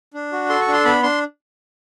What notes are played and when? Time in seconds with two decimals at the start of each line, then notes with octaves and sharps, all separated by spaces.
0.14 D4
0.32 F#4
0.49 A4 C6
0.61 C#6
0.68 D4
0.73 C6
0.85 B3 B5
1.03 D4 C6